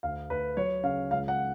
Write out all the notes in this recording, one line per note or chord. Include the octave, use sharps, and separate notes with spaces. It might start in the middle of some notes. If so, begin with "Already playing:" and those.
D2 F5
D2 B4
F#3 C#5
C#3 F5
C#2 F5
F#5